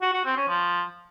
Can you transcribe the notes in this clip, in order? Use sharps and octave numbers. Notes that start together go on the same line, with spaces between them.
F#4
F#4
C4
C#4
F3